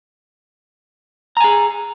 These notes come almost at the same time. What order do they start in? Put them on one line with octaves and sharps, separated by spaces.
A#5 G#5 G#4